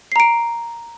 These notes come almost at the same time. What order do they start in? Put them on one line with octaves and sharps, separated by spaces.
C7 A#5 D7